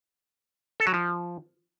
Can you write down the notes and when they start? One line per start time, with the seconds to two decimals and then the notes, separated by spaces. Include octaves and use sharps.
0.80 A4
0.87 F#3
0.94 F3